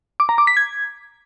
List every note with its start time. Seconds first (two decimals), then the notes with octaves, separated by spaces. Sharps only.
0.20 D6
0.29 A#5
0.38 D6
0.47 B6
0.57 G#6